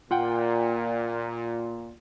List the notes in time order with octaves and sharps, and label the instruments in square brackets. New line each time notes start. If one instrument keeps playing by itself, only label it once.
[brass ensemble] A#2 [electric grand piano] F4 F#5 G5